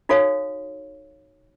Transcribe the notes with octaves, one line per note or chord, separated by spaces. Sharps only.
D#4 F#4 A4 C#5 F5